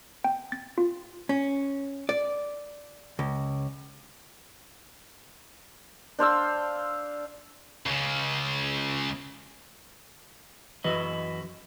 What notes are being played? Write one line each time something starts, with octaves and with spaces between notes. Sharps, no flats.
G5
A6
F4
C#4
D5
C#2
D4 C5 F5 E6
C#2 C#3
F#2 E3 F#4 B4 D#5